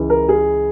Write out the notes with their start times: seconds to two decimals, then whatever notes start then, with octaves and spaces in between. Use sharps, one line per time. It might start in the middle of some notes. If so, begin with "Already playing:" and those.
Already playing: C#2 C#3 E3
0.10 A#4
0.29 G#4